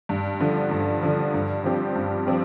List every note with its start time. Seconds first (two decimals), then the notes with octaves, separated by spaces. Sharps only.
0.09 G2
0.40 D3 F3
0.71 G2
1.03 D3 F3
1.34 G2
1.64 F3 C4 G4
1.95 G2
2.27 F3 C4 G4